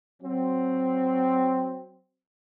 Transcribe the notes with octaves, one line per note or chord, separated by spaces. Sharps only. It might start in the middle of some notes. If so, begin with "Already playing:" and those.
F#3 C4